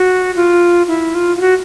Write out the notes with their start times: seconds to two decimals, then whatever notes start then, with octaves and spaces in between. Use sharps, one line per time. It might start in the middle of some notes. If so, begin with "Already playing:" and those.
Already playing: F#4
0.36 F4
0.88 E4
1.15 F4
1.37 F4
1.41 F#4